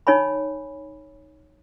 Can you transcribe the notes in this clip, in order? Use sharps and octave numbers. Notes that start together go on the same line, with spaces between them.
D#4 C#5 G#5 B5